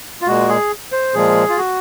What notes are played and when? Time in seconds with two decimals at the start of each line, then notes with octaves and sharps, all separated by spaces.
0.21 F4
0.27 A#2 G#3 F#4
0.49 G#4
0.92 C5
1.14 A#2 F3 G#3 G#4
1.49 F4
1.58 F#4